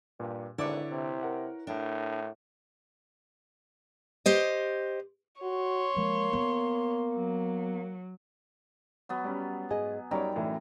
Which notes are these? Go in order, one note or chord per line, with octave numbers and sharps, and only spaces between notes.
G2 A#2
G#1 D3 E4 B4 C#5 D5 D6
C3
A#4 F#5
A2 D4
G4 C5 D#5
F#4 C#5 C6
F3 G#3 A#3
B3
F#3
F#3 B3
G3 C#4
G#2 G#4 D#5 G#5
F#2 G3 D#4 C#5 D5 G5 A#5
A2 E3